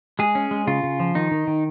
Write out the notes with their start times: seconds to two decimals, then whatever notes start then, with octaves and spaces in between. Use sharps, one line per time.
0.19 G#3 G#4
0.35 C#4
0.51 G#3
0.67 C#3 F4
0.83 C#3
1.00 F3
1.15 D#3 D#4
1.31 D#3
1.47 D#3